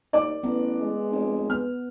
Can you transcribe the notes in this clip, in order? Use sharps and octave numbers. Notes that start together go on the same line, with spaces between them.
D#2 D5 D6
A1 B3
G#3
F1
B3 F6